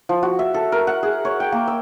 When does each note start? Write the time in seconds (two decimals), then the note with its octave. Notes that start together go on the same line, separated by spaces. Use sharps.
0.09 F3
0.23 F#4
0.39 E5
0.54 A4
0.72 A#4
0.87 F#5
1.03 G#4
1.25 C#5
1.40 G5
1.52 A#3
1.67 E6